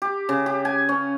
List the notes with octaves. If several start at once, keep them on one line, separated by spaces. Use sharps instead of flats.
G4
C#3
G4
G#5
C#4